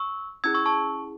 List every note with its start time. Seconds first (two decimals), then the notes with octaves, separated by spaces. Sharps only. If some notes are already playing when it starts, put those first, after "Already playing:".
Already playing: C#6 E6
0.44 C#4 E4 G#4 E6 G#6
0.54 C#6 E6
0.66 A5 C#6